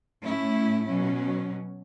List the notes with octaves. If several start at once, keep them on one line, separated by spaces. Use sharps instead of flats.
A2 A3 C#4 E4
B2 F#3 C#4